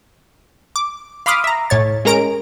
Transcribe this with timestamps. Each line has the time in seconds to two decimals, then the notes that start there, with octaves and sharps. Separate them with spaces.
0.76 D6
1.26 F5 B5 C6 D6 D#6 F6
1.44 E5 A#5
1.70 A2 C#5 A6
2.05 G#3 C#4 A#4 A#5 D7